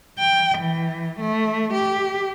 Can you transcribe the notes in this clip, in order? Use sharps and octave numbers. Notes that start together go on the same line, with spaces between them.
G5
E3
A3
G4